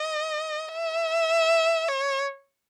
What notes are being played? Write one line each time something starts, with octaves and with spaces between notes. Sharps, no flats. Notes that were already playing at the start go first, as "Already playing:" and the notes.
Already playing: D#5
E5
C#5